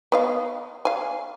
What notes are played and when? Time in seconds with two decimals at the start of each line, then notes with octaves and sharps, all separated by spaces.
0.12 B3 D#5 F5
0.85 F5 G#5